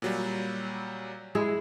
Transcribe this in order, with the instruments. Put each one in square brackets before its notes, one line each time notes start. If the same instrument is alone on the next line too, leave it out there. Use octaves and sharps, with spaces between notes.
[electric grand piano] A#2 F#3 G3
[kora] G#3 E4 G#4